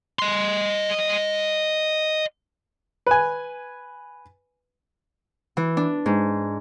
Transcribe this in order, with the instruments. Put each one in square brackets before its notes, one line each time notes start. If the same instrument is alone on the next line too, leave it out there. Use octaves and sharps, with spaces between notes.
[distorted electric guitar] D#5 C6
[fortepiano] B4 G#5
[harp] E3
D4
G#2